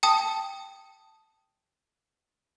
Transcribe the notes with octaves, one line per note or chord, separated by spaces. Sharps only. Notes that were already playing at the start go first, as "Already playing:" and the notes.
G5 A5 D#6